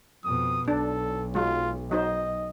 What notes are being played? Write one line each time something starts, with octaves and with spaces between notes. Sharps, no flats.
F2 B2 D#6
B1 D4 A4
F#3 G#3 F4
F#3 D#4 C5 D#5